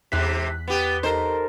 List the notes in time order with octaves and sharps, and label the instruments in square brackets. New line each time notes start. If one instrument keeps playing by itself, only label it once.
[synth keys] E2 F#6 B6 [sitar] G#2 C3
[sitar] B3 G4
[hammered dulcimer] D#4 A4 A#4 [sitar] C5